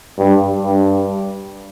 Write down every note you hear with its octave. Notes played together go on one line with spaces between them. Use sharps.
G2
G2